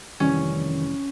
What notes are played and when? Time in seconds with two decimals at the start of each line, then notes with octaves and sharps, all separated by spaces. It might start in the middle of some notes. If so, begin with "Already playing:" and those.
0.20 F1 D#3 E3 G3 C#4